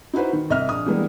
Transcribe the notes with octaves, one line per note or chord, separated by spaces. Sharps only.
D#4 E4 F#4 B4 C5
D#3
C2 D#5 E5 F6
A#1 D#6
E3 G3 G#3 A#3 B3 D4